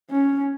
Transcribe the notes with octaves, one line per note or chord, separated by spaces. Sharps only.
C#4